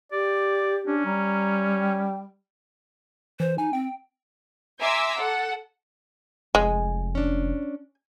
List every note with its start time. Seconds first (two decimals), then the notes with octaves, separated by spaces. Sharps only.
0.12 G4 D5
0.87 C#4 D4
1.05 G3 A#5
1.79 G5
3.40 E3 C5
3.58 D#4 G#5
3.73 C4 G5
4.80 E5 G#5 A#5 C6 D6 E6
5.18 A4 F#5
6.55 F1 G#3 G#5
7.15 C#4 D4